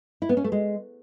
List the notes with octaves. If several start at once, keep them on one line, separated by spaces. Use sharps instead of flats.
E4
B3
C#4
A3
G#3